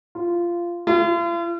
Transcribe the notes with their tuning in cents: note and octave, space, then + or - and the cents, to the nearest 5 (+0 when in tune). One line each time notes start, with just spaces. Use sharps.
F4 -15
F4 -45